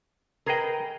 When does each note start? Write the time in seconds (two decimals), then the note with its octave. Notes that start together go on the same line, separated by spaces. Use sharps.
0.46 G#4 A#4 B4 D#5 G5